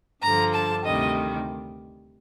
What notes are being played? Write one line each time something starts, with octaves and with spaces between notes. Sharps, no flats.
G2 D3 F3 A#5
A5
D2 C3 D#3 G3 D#5